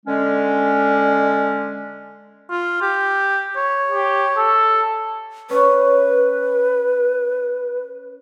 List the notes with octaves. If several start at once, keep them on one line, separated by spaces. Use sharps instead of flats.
D3 G#3 C#4
F4
G4
C#5
G4
A4
C#4 B4